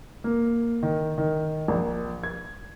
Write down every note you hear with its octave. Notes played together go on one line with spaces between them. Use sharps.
A#3
D#3
D#3
A#1
G#6